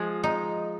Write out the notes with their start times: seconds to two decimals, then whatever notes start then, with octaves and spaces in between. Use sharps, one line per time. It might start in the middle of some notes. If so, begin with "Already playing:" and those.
Already playing: F3 G#3
0.24 D#4